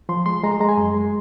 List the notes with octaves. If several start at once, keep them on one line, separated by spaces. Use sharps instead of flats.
F3 C6
G#3 C6
G#3 A#5
C6
G#3 A#5
G#5
F#2 C6
G#3